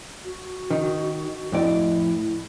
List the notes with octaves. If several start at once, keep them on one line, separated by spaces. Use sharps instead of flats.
F#4
D#3
F2 A2 E4 D5